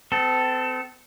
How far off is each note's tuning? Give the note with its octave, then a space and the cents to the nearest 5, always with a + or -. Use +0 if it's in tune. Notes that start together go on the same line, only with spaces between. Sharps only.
C4 -40 A4 +0